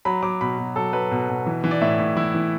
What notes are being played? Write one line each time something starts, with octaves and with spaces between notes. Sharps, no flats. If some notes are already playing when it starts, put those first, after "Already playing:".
F#3 B5
F#3 D6
B2 B5
B2
F#3 A4
F#3 B4
B2
B2
E3
E3
D5
A2 E5
A2
E3 E4
E3